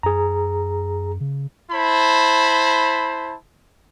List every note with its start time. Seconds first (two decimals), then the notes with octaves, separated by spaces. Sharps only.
0.03 F#2 G#4 A#5
1.20 C#3
1.71 E4 C5 A5 B5